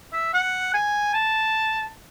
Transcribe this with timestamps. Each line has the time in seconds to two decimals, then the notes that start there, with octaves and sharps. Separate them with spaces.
0.13 E5
0.34 F#5
0.74 G#5
1.14 A5